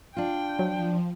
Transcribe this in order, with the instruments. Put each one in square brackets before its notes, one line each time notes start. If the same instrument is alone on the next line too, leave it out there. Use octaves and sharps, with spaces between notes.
[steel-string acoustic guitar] D4 F4 [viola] G5
[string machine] F3 [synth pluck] F#3